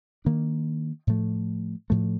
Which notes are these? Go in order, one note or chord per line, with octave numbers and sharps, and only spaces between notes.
D#3 A#3 D4
A2 F3 A3
A2 F3 A3